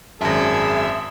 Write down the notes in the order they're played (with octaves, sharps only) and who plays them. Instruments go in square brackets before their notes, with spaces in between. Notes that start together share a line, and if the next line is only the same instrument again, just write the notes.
[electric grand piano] G#1 F#2 [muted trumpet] G#4 [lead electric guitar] E5 [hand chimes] A5 A#6